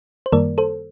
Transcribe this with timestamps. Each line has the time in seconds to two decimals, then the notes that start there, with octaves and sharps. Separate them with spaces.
0.26 C5
0.32 F#2 D#3 G3 A#3 A#4 D5
0.58 A4 C5